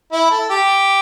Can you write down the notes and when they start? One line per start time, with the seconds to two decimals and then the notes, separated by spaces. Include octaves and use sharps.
0.12 E4
0.31 A4
0.50 G4